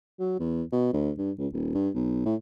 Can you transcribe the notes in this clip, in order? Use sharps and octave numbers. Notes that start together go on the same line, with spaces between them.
F#3
E2
B2
D2
G2
C#2
D#1
G2
B1
A2